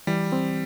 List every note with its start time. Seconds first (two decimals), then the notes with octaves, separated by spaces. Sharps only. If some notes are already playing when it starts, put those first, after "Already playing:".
0.07 E3 G3
0.32 C4